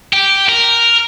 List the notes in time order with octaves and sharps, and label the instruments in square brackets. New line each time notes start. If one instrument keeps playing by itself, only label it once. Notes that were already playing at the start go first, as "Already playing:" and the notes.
[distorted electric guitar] G4
A#4